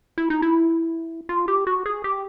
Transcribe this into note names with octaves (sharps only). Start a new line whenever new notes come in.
E4
D#4
E4
F4
G4
F#4
G#4
G4